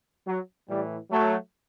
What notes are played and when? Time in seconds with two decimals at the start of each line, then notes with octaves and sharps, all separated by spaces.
0.27 F#3
0.69 A2 E3 G3
1.11 F#3 A3